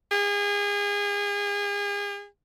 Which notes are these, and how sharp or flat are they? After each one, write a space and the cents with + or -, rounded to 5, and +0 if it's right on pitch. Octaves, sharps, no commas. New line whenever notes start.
G#4 -35